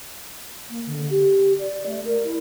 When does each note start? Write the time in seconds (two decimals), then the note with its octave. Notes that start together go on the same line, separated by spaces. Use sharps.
0.69 A#3
0.86 D3
1.10 G4
1.58 D5
1.86 A3
2.04 A#4
2.24 E4